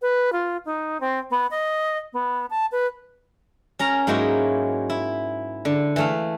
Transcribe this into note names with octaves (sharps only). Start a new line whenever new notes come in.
B4
F4
D#4
C4
B3
D#5
B3
A5
B4
C#4 A#4 A#5
G#2 F#3 A#3 D#4 E4 F#4
E4
D3
E3 A3 F5